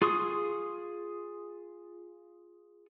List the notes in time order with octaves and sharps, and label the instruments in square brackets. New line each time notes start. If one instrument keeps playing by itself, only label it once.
[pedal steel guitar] F4 G#4 C6 C#6 D#6